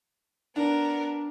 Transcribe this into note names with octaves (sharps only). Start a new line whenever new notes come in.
B3 D4 A#4